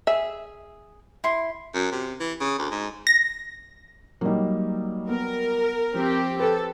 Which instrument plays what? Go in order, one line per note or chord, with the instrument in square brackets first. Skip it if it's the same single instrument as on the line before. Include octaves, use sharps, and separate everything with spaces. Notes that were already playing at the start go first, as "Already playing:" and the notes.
[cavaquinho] G#4 [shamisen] E5
[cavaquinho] E4 C6
[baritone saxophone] F#2
C3
E3
C#3
D2
G#2
[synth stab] A#6
[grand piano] F#3 G3 [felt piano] A#3 D#4
[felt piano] B3 [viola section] A#4
[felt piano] F3 [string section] C4 G4
[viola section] A4 [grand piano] B4